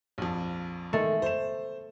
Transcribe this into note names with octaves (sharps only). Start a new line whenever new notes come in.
A#1 F2
D#3 G#3 A3
C5 E7